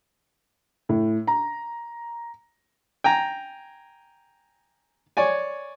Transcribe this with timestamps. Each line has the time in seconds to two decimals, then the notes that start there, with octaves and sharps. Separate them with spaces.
0.89 A2
1.27 A#5
3.04 G5 G#5 A#5
5.17 C#5 D5 G#5